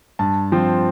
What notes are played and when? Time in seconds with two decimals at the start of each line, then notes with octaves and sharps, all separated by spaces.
0.19 G2 A5
0.52 F3 C4